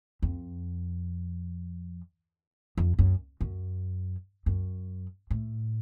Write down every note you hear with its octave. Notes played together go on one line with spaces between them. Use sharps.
F2
F2
F#2
F#2
F#2
A2